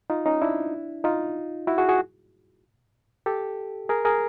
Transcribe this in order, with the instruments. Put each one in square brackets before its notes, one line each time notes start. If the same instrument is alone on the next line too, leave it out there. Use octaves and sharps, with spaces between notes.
[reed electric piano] D#4 F4
C#4 D#4
D4 E4
D#4 F4
E4 F#4
F#4 G#4
F#4 G#4
G4 A4
G#4 A#4
G#4 A#4